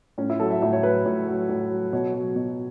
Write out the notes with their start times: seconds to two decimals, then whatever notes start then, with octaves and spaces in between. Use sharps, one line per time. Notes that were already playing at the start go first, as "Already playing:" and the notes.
0.18 A2 C#4
0.30 E4
0.40 F#3 A4
0.51 E5
0.62 A2 E5
0.73 C#5
0.83 F#3 B4
1.06 A2
1.27 F#3
1.49 A2
1.71 F#3
1.93 B2 C#5
2.14 F#3
2.36 B2